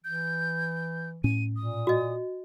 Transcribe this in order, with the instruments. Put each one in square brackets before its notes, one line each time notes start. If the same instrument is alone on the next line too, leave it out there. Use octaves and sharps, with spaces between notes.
[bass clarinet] E3 [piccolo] G6
[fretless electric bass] A2 C#4 [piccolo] D#7
[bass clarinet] A#2 [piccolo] D#6
[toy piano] F#4 D#5